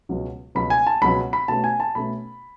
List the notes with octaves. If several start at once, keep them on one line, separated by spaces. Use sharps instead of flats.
C#2 B2 F#3 C#4
C#2 B2 F#3 C#4 B5
G#5
A5
C#2 B2 F#3 C#4 B5
B5
B2 A3 C#4 A5
G#5
A5
B2 A3 C#4 B5